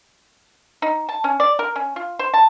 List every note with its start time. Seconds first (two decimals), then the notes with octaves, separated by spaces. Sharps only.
0.82 D#4
1.09 A5
1.24 C#4
1.40 D5
1.59 A#4
1.76 C#4
1.96 F4
2.19 C5
2.34 A5